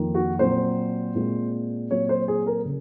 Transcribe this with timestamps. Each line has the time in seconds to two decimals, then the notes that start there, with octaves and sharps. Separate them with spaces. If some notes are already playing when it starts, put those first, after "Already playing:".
Already playing: F2 D#3 A#3
0.14 F#4
0.39 A#2 F#3 C4 C5
1.15 A#2 G#3 C4
1.90 A#2 F#3 C4 C#5
2.09 C5
2.28 G#4
2.47 A#4
2.65 C#3